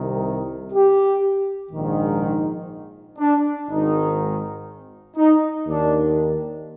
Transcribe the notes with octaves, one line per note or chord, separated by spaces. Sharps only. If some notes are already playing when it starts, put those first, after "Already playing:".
Already playing: C2 C3 D#3
G4
A#1 G#2 D#3
D#4
D4
G#1 G#2 D#3 D#4
D#4
D#2 D#3 D4